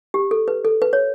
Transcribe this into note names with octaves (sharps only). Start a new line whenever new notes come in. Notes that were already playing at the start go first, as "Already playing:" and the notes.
G4
A4
B4
A4
B4
C#5